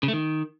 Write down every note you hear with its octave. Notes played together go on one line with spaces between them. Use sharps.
C#3
A3
D#3